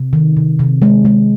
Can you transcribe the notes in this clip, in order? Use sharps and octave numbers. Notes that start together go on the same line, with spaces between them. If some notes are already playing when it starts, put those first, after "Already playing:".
Already playing: C3
D#3
C3
C3
G#3
G#3